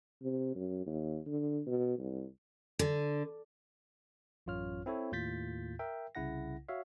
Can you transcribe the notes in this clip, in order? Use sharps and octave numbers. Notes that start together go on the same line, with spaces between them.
C3
F#2
D#2
D3
B2
C2
D3
A1 F#2 F4 C#5 F6
C4 E4 A4 C#5
D#2 A2 F4 G6 A6 B6
A#4 E5 G5
C2 C#3 E4 F#5 A#6
F#4 C#5 E5 F5